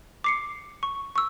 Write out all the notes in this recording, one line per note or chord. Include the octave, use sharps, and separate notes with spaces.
D6 C7 C#7
C#6
C#6 E6